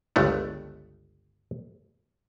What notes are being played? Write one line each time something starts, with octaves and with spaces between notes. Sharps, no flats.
G1 C#2 G2 A3 B3